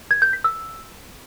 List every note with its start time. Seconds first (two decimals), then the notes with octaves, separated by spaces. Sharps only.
0.11 G#6
0.22 G6
0.33 B6
0.44 E6